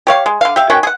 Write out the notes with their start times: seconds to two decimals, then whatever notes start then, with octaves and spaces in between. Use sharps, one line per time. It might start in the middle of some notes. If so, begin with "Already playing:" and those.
0.07 G4 C#5 F5
0.26 G#3
0.41 D3 F5
0.56 G4 E5 F5
0.70 D#3 C#4 F#4 G5
0.83 G#4 F#5